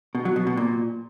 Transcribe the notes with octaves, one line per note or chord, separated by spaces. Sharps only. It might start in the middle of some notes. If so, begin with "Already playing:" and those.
B2
F#3
B2
B2
A#2